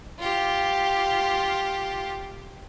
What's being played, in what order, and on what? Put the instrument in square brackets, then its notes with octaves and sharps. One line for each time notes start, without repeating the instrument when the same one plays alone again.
[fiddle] F4 G4